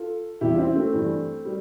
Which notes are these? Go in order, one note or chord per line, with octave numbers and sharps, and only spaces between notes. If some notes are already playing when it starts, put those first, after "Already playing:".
Already playing: F4 A4
E2 C3 G3 E4 G4
F4
C4 E4
A3 C4
G2 E3 G3
G3